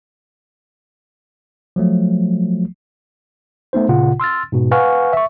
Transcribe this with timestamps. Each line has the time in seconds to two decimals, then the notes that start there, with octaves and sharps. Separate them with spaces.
1.76 F3 F#3 A3
3.73 A3 B3 D#4 C5
3.89 G1 A#2 C#3 F4 F#5
4.20 C6 E6 F6 A6
4.52 G#2 B2
4.71 B4 F5 F#5 G#5 C#6 F6
5.13 E5 C#6